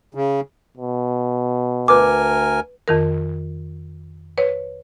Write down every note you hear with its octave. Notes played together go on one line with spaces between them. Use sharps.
C#3
B2
D2 A#4 B4 G#5 D6
F2 D#3 A#4
B4 C#5